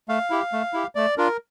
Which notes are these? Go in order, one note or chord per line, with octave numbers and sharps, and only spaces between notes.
A3 F5
E4 G4
A3
E4 G4
A3 D5
D4 F4 A#4